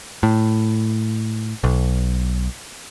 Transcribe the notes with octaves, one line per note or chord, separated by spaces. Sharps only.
A2
B1